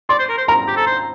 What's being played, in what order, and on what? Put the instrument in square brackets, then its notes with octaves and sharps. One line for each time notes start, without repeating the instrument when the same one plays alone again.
[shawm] D5 [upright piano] C6
[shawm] C5
A#4
C5
[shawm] A#4 [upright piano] A#5
[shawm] G4
A4
C5